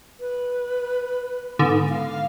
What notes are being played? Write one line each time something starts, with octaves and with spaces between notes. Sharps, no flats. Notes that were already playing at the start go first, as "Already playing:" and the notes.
B4
G#2 D3 B3
F5